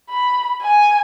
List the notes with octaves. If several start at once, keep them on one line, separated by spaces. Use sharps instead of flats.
B5
G#5